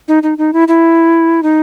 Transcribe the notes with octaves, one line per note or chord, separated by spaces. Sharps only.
D#4
D#4
D#4
E4
E4
D#4